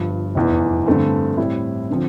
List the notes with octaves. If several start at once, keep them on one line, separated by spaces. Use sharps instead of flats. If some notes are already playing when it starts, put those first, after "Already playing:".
Already playing: G1 G2 F3
F1 E2 E3
G2 D3 A3 C4
A2 G3 C4 E4
D3 F3 C4